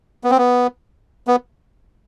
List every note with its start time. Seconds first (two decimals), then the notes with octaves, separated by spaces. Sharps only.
0.24 B3
0.30 C4
0.37 B3
1.27 B3